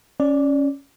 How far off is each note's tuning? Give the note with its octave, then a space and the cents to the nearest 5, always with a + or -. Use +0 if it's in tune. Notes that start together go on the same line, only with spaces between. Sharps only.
C#4 +0 D5 +0